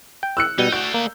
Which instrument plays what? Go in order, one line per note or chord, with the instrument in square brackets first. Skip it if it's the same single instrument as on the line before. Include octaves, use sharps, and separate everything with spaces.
[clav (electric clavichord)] G5
[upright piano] E6 F#6 C#7
[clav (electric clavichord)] B2 G3 [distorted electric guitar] D#4
[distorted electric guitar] A3 D5 [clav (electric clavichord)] F#4 [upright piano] G6
[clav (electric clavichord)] A#3